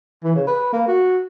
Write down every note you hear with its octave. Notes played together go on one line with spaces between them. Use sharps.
E3
C#3
B4
A#3
F#4